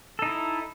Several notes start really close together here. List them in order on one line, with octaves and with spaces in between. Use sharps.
A4 D#4 E4